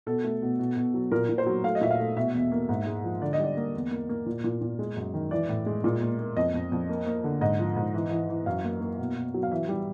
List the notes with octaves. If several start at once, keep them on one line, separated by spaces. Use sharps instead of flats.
B2 A4
A3
B2
B2
B2
F#3
A#2 A#4
A#2
C5
F#3
A3 F5
D#5
A#2 E5
F5
A3
B2 E5
E2
A#3
G#2
G#3
F3
D3 D5
D#5
G3 D5
A#3
E2
A#3
A#3
A#2
A#2
A#2
G#3
F#2
D#3
E3 D5
A2
G#3
A#2
A#3
A#3
F2 D#5
F2
F2
A#3
A#3
D3
G#2 D#5
F3
G#2
E3
E3
E3
F#2 F5
A#3
A#3
B2
B2
F#3
F5
E3 E5
G3